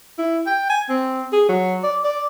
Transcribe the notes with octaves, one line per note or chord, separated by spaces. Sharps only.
E4
G5
G#5
C4
G#4
F#3
D5
D5